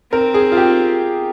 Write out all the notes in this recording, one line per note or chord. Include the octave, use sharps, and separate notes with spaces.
C4 A#4
G#4
F4
G4